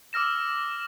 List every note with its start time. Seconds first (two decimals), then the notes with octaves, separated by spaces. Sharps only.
0.13 D6 E6 F6 A#6 E7